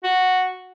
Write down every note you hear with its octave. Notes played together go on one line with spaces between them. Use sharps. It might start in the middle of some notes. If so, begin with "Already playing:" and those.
F#4